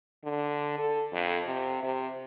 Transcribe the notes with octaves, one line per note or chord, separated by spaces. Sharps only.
D3
A4
F2
C3
C3